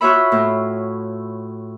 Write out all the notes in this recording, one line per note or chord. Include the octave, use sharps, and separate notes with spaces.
F4 F#4 C#5 E5 B5
A2